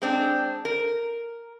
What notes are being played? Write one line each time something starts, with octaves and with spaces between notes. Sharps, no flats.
G#3 C4 D4
A#4